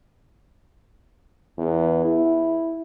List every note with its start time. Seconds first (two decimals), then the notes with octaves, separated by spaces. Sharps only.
1.58 E2
2.05 E4